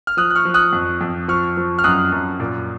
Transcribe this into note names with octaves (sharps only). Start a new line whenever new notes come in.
F6
F3 D#6 F#6
F#6
C#6 F6
F3
D#6 F#6
F2
F2
F3 C#6 F6
F3
F6
F#2 D#6 F#6
F#2
A#2